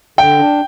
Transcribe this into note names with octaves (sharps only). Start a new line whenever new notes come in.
D3 G5
D4